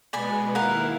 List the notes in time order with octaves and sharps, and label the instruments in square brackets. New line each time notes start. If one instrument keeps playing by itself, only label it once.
[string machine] B2 G#3 B3 [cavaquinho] D5 G#5 B5
[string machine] D#2 E4 [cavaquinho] A#4 F5 F#5